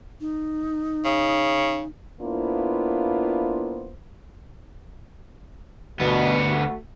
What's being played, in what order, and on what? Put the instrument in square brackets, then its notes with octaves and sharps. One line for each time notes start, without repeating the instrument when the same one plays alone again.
[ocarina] D#4
[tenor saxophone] C#3
[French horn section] A#3 B3 D4 E4 F4 C5
[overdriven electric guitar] D2 B3 [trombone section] B2
[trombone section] A3 F#4